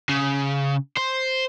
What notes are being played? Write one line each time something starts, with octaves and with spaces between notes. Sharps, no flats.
C#3
C5